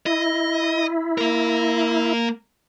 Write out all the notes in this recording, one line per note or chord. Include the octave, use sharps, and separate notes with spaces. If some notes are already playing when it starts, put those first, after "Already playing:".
E4 D#5
A#3 A#4